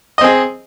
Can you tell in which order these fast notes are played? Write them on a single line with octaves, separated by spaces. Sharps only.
D#5 C4 G#4